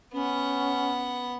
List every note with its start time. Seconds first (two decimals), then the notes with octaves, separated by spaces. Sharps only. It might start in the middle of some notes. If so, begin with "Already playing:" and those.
0.14 B3 C#4 F#5